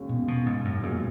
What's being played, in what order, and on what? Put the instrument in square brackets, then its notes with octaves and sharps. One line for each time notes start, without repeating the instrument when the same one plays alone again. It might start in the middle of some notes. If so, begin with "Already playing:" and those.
Already playing: [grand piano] E1 D#2 C#3 G#3 C#4
[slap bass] B2
B2
G#2
F#2
[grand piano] B1 A#2 G#3 [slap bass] F#2